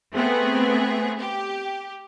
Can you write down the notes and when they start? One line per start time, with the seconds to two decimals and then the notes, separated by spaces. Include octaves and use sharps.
0.15 A3 B3 C4 G#4
1.19 G4